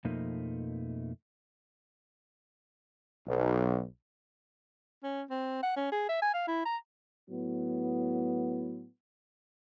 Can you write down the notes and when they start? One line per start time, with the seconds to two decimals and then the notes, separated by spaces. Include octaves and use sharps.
0.05 F2 B2 F3 A3 A#3 D#4
3.26 B1
5.03 C#4
5.30 C4
5.63 F#5
5.76 C#4
5.92 G#4
6.09 E5
6.22 G#5
6.34 F5
6.47 E4
6.65 A#5
7.29 A2 F#3 B3